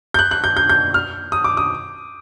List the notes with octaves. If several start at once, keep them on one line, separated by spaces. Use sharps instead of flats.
G6
F#6
F#6
G6
G6
G6
F6
D#6
D6
D#6